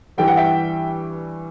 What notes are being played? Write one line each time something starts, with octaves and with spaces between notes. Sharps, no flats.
G2 E3 G3 G5
F#5
E5 G5